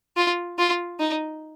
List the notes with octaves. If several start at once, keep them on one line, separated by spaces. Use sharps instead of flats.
F4
F4
D#4